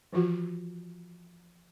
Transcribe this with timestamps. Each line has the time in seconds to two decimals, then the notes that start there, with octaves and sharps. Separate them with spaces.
0.13 E3 F3 F4 F#4